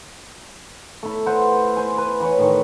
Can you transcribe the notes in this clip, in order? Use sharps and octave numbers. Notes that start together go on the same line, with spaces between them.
A3 E4
B4 C5 F#5
C5 G#5
B4
E3 B4 C#5
A2 D#3 C#6